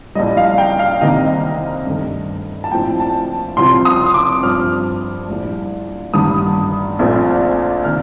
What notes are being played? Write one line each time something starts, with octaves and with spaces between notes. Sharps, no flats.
A#1 A2 G3 D#5
F5
G5
F5
C2 C3 D#3 A#3 D#5
G2 D#3 A3
A5
A#1 A2 F3 C4 G5
A5
C2 C3 F3 C6
D#6
D6
G2 F3 C4 F6
A#1 A2 G3
A1 G2 D#3 G3 A#3 D#6
A#1 A#2 A3 C4
C3 D#3 A#3 F6